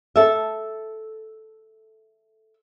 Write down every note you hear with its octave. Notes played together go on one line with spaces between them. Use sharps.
A4 E5